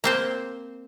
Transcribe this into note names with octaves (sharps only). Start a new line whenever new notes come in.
A#3 C4 C5